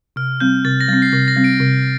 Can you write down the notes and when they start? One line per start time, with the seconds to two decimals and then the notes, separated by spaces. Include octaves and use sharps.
0.16 C3 F6
0.40 G3 C4 G6
0.65 C3 A6
0.81 A#6
0.88 G3 C4 A6
1.02 C7
1.12 C3 A#6
1.28 A#6
1.36 G3 C4
1.44 D7
1.60 C3